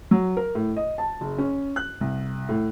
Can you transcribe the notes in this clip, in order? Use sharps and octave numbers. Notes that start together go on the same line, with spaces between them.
F#3
A#4
A2
D#5
A5
F#1
C#4
F#6
C2
A2